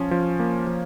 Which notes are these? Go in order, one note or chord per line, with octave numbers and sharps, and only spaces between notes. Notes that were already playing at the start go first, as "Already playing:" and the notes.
Already playing: F3 C#4
F3
A#3
F3